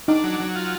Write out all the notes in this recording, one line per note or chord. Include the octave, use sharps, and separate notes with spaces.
D4 D#4
F#3
F#3
F4